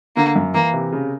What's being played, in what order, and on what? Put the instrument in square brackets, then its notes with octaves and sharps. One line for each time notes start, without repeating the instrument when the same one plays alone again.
[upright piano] D3 [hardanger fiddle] A#3
[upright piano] F#2
[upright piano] E3 [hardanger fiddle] A#3
[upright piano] C3
C#3